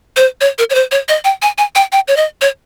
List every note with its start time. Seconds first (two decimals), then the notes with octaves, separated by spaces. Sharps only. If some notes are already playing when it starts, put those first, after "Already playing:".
0.16 C5
0.41 C#5
0.58 A#4
0.70 C#5
0.75 C5
0.91 C#5
1.09 D#5
1.25 G5
1.42 G#5
1.58 G#5
1.75 G5
1.92 G5
2.08 C#5
2.17 D#5
2.41 C#5